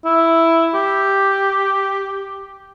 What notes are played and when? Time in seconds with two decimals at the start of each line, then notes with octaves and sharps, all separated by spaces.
0.05 E4
0.74 G4